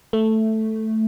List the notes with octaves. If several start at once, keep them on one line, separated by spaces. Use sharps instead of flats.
A3